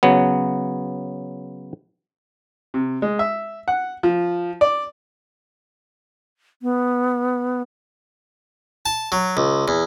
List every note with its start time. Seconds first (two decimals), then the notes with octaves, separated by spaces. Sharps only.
0.03 C#3 F#3 B3
2.74 C3
3.02 G#3
3.19 E5
3.68 F#5
4.03 F3
4.61 D5
6.62 B3
8.86 A5
9.12 F#3
9.37 C#2
9.68 E2